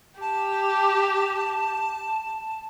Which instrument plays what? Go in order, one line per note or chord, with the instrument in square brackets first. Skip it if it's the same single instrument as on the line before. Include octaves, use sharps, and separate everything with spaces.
[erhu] G4 [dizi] A5